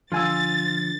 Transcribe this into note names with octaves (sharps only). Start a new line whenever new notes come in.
D3 F3 F4 G#5 E6 A6